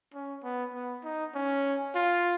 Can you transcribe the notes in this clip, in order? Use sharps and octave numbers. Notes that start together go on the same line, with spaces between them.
C#4
B3
B3
D#4
C#4
F4